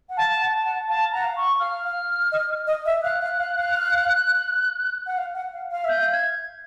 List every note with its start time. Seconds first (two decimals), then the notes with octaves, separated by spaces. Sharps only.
0.09 F#5
0.17 F5 A5
0.41 F#5
0.53 A5
0.65 F#5
0.88 F5 A5
1.12 F#5 A#5
1.24 F5
1.36 C#6
1.59 F5 F6
1.84 F5
2.32 D#5
2.67 D#5
2.85 E5
3.03 F5 F#6
3.21 F5
3.38 F5
3.56 F5
5.06 F#5
5.17 F5
5.35 F#5
5.53 F5
5.71 F5
5.84 E5 G6
5.97 F5
6.13 G#6